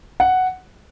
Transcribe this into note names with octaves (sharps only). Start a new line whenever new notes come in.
F#5